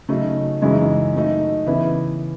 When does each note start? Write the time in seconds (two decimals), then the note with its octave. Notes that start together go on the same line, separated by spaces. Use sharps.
0.09 C#3 F#3 A3 D#4
0.61 F#2 C#3 E3 G#3 D#4
1.15 F#3 A3 D#4
1.66 C#3 E3 B3 E4